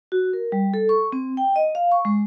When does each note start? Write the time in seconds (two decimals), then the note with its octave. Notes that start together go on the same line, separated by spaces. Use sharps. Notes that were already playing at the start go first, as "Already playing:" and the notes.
0.12 F#4
0.33 A#4
0.52 G3
0.74 A4
0.89 C#6
1.12 C4
1.37 G5
1.56 D#5
1.75 F5
1.92 C#6
2.05 G#3